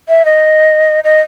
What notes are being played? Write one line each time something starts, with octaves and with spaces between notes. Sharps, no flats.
E5
D#5
D#5